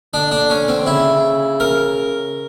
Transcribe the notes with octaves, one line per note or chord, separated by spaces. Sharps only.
D3 D4
D4
C#4
C4
C#3 E4
A#4